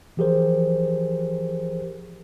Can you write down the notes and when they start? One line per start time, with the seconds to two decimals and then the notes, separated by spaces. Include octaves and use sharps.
0.17 E3 F3 G4 G#4 A#4 C5